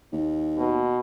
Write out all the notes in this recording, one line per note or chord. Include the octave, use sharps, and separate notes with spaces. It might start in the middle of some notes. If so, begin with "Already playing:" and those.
D#2
B2